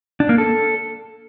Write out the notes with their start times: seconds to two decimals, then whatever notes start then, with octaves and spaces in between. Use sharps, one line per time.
0.20 D4
0.29 A#3
0.38 A4